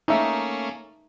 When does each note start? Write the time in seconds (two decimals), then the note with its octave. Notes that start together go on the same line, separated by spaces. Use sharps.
0.08 A3 A#3 C#4 D#4 E5